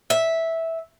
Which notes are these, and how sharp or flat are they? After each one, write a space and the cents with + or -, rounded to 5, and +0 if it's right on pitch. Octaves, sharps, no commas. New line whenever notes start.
E5 -10